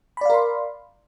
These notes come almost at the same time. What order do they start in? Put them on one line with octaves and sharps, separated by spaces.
B5 D5 F5 A#4 C6